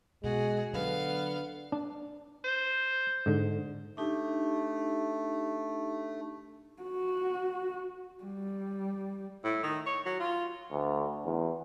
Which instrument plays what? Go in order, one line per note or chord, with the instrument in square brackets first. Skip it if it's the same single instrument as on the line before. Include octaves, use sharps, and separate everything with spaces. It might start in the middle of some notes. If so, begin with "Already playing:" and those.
[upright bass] B2 [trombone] G#3 [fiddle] F#4 G#4
[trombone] D3 [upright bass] F#3 [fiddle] B3 F5
[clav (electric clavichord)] D4
[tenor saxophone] C5
[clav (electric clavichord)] G#2 D3
[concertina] A3 [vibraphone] D4 D#4 G4
[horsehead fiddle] F#4
G3
[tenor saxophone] A2
D#3
C#5
F#3
F4
[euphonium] D2
E2